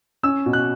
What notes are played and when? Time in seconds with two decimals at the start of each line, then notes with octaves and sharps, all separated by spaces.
0.23 C#4 E6
0.46 B2
0.53 F#6